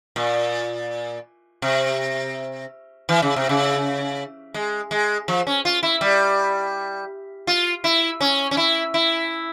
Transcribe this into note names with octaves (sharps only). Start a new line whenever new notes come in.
A#2
C3
E3
C#3
C3
C#3
G#3
G#3
F3
C#4
F4
E4
G3
F4
E4
C#4
C#4
E4
E4